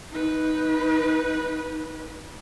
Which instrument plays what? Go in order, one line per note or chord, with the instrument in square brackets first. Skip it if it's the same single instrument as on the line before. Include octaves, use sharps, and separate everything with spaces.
[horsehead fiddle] D#4 B4